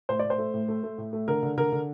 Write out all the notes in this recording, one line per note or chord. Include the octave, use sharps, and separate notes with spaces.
A2 C5
A2 D5
C5
A3
A2
A3
A3
A2
A3
D3 A#4
D3
D3 A#4
D3